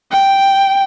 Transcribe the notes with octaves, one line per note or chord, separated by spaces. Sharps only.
G5